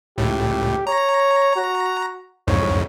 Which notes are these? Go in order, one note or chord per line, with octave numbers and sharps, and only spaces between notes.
C#2 A2 G4
C#5 A#5
F#4
C2 F2 G#2 C#5